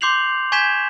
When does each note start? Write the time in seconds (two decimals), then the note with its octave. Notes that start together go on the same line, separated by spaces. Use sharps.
0.01 C6 D6 G6 C7 F7 F#7
0.52 G#5 C#6 G6 G#6 B6 E7